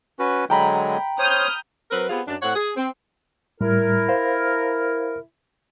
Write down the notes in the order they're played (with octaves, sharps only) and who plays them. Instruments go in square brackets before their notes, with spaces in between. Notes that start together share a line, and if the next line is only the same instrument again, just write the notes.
[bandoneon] C#4 F#4 B4
[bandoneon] D3 F#3 G#3 [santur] G5 A#5 B5
[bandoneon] C5 C#5 [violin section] D#6 F6 G6
[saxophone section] F#3 C4 A#4 B4
B3 C4 F4 G4 G#4
F#2 D4
A2 C4 C#5 F#5
G#4
C4
[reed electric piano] A2 G3 [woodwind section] E4 A#4
[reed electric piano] C5 F5